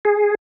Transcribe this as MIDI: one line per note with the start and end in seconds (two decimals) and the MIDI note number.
0.05 0.35 68